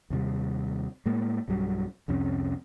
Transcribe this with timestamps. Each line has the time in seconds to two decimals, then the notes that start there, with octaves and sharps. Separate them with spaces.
0.10 D#2 C3 G3
1.06 A2 G#3 A#3
1.48 B1 G2 F#3 G3
2.08 C2 F2 C3 C#4